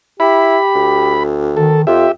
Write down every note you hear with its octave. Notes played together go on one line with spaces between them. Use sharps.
E4 G4 B5
D2
D#3 A4
F2 F4 G4 E5